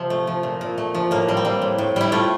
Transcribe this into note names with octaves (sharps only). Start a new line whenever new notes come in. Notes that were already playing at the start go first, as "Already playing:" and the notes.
Already playing: C3 F3 C4
A3
F3
A#2
A#2
A3
F3
A2 A#3
G3
C4
G3
A2
A2
G3 E4
A3 F4